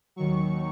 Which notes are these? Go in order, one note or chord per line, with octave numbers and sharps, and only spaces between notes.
D#2 D#3 F#3 C#6